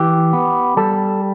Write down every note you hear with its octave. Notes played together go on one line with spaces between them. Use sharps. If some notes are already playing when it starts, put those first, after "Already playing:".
Already playing: E3 G4
B3
G3 A4